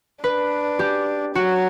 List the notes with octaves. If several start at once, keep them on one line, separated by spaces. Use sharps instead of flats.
D4 B4
G4
F#3 F#4